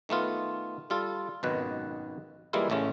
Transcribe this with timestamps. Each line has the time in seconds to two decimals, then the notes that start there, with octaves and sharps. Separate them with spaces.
0.09 D#3 A3 B3 F4
0.90 G3 F4 A4
1.43 G#1 C#2 F#2 B2 D#3 B4
2.53 E3 G3 G#3 A#3 E4 F4
2.70 A1 C#3 A3 C#4